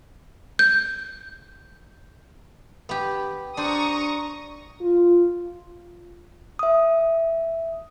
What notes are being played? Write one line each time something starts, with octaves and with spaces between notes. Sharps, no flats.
G6
B3 G4
D4 C5 A#5 C#6 D#6
F4
E5 D#6